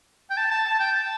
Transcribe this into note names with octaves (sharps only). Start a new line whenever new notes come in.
G5
A5
A5
A5
G5
A5